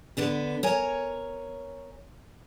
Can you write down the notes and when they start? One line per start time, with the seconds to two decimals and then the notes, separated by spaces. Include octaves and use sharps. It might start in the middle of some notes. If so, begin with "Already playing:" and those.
0.17 D3 B3 D4 B4
0.63 A#4 C#5 G#5